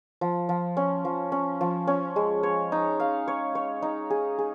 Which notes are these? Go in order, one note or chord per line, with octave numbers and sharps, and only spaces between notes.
F3
F3
C#4
F3
C#4
F3
C#4
G#3
C#5
D#4
F5
C#5
C#5
D#4
G#4
G#4